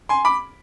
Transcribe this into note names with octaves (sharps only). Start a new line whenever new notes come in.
G#5 C6
B5 D6